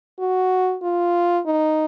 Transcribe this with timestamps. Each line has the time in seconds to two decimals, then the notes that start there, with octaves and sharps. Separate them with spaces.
0.20 F#4
0.83 F4
1.46 D#4